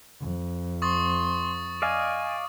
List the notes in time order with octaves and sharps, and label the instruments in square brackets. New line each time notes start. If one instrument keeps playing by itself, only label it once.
[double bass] F2
[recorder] C6 [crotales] C#6 D#6 A6
[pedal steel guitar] D5 D#5 F5 [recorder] G#5